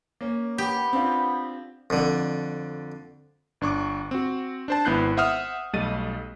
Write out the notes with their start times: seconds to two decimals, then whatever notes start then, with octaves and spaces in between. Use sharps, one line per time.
0.21 A#3 C#4
0.58 B3 G4
0.93 C4 D4 F4
1.90 F2 D3
3.61 G1 D4 C#6 D6
4.11 C4 F#4
4.68 D4 C5 A5
4.85 G#1 B3 E4 F#6 G6 C7
5.17 C5 E5 F#5 D#6 F6
5.73 B1 G3 A3 D#5 A6 D#7